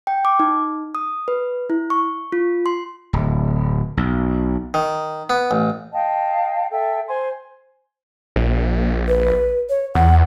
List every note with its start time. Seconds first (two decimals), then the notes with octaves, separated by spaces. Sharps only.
0.07 G5
0.25 D6
0.40 D#4
0.95 D#6
1.28 B4
1.70 E4
1.90 C#6
2.32 F4
2.66 C6
3.13 D1
3.97 B1
4.74 D#3
5.30 B3
5.51 A1
5.92 D#5 F5 G5 A5
6.71 A4 E5 G5
7.09 C5 G#5 C6
8.36 A#1
9.08 B4
9.70 C#5
9.95 E2 F#5